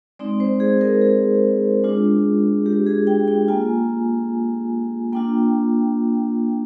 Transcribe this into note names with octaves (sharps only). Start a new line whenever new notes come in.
G#3 C4 D#4 D5
C5
G#4
A#4
G#4
G#3 D4 F4
G4
G#4
G5
G5
A#3 F4 G#5
A#3 D4 F4 G5